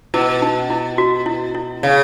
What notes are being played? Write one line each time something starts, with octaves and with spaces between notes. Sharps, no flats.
B2 E4
D#4
E4
F#4
E4
E4
C#3